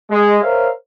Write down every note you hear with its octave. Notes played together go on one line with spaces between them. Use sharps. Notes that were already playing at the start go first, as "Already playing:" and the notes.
G#3
A#4 C5 C#5 E5 F5